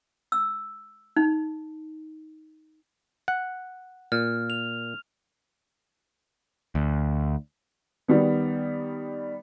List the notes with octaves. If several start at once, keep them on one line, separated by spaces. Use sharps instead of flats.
E6
D#4
F#5
A#2 F6
F7
D2
D#3 G3 B3